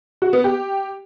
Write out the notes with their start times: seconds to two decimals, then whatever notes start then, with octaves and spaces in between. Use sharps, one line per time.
0.22 F#4
0.33 B3
0.44 G4